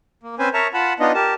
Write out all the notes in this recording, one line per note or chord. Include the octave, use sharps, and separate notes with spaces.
A#3
C4 C#4 B4 C5 G#5
A#4 C#5 E5 A5 A#5 C#6
F4 F#5 A5 B5
B3 D4 D#4 F4 D#5
G4 A#4 A5